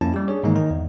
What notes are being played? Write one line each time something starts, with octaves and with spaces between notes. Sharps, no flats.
F2 F3 A#3 C#4 E4 A5
G3 G4
D4 G#4 C#5
G#2 D#3 E3 G#3 A#3 D#4
D#3 D#4 A#5
E2